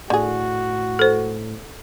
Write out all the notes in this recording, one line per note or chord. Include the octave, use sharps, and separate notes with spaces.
A2 D3 F#4 G#4
A4 C5